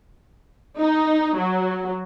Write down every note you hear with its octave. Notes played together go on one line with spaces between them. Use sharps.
D#4
F#3